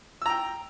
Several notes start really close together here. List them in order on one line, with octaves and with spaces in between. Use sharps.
E6 A#5 G5